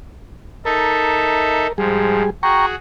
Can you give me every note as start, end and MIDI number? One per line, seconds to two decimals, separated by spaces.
0.65 1.67 63
0.65 1.67 69
0.65 1.73 70
0.65 1.67 76
1.78 2.23 44
1.78 2.23 53
1.78 2.30 55
1.78 2.30 68
2.43 2.75 66
2.43 2.75 68
2.43 2.66 79
2.43 2.66 82
2.43 2.66 85